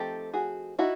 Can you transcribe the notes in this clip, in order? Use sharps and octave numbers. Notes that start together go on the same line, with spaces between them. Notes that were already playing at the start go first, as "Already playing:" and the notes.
Already playing: F3 A3 C4 D#4 G4 A4
F#4 G#4
D#4 E4 F#4